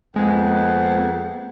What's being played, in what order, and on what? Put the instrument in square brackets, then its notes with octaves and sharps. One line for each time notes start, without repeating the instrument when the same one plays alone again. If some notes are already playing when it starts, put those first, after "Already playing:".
[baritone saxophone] F2 [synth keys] G#3 [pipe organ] A#3 B3 [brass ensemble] F#5